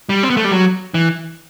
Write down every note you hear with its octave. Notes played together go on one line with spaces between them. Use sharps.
G3
C4
B3
A3
G3
F#3
E3